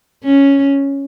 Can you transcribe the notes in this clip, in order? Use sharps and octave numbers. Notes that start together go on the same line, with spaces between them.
C#4